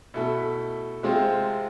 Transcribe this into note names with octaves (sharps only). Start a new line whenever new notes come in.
B2 A3 E4 A4
C3 G#3 C4 F4